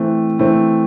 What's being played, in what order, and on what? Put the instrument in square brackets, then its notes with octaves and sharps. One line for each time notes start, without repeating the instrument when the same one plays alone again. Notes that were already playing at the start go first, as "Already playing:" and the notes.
Already playing: [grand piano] E3 A3 C4
E3 A3 C4